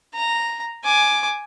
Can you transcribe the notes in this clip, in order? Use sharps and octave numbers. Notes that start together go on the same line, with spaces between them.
A#5
G#5 D6